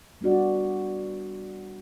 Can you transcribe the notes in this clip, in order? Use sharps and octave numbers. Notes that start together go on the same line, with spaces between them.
G3 B3 D4 F#4 D5